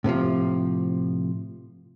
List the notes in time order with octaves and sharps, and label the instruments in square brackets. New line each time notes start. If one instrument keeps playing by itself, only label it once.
[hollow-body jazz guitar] A2 C3 E3 F3